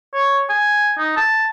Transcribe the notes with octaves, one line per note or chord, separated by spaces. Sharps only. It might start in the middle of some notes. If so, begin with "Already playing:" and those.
C#5
G#5
D#4
A5